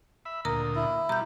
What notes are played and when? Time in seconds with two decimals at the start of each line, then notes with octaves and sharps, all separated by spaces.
0.25 E5 B5
0.45 D2 A#2 A#4 D#5 A#5
0.75 E4
1.09 B2 G3 A#5 G6